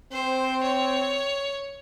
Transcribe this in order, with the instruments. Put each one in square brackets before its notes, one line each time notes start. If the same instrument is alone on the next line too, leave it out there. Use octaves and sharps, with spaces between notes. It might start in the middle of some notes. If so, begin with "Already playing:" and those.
[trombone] C4 [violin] C5
[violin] C#5